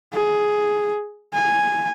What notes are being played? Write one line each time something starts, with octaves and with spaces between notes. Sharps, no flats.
G#4
G#5